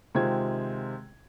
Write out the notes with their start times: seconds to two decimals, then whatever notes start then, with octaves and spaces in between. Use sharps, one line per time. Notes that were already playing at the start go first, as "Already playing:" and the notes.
0.15 C3 D#3 G#3 C4 F4 G#6